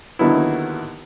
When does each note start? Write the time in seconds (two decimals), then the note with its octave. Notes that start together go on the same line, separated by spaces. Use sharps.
0.19 D#2 D3 F#3 B3 E4